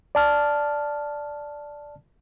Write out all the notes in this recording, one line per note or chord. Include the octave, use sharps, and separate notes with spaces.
D5 A5 F6